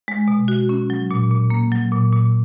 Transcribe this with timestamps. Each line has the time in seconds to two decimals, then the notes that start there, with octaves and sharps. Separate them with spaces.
0.08 G#3
0.28 B2
0.48 F#4
0.69 C#4
0.90 F#3
1.11 A#2
1.31 A#2
1.50 A#3
1.72 F#3
1.92 A#2
2.13 A#2